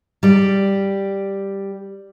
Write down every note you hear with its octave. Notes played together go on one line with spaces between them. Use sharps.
G3 D5